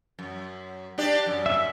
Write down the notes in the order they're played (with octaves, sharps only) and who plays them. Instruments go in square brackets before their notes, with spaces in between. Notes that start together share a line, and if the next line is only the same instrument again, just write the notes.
[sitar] F#2
D4 G4 D5
F#2
[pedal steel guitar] E5